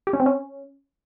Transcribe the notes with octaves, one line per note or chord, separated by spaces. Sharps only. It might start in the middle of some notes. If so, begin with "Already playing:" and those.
G4
C#4
C4
C#4